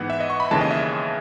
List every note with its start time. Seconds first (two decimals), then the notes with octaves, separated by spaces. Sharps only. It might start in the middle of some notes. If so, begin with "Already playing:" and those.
Already playing: G#2 E3 B3 F#5
0.10 E5
0.20 D#5
0.30 C#6
0.40 B5
0.51 D#2 C#3 E3 G#3 A5
0.61 D#5
0.71 E5
0.81 D#5